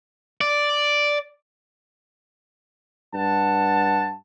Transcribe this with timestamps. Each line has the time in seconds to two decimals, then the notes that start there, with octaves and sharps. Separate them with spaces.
0.41 D5
3.15 G2 F#5 A5